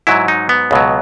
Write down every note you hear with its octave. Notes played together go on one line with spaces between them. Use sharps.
G#2 F#3 E4
D#4
B3
C#2 B2 F#3